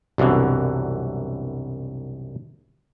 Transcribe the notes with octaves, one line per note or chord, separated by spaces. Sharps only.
C2 F#2 B2 D3 E3